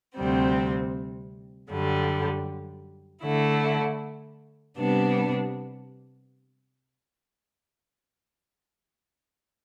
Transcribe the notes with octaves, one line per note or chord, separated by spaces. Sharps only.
D2 C3 G3 C4
F#2 D3 G3
D3 A3 E4
C3 G3 B3 D4